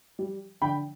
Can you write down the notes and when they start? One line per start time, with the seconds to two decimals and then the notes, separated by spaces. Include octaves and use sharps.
0.19 G3
0.62 D3 G5 B5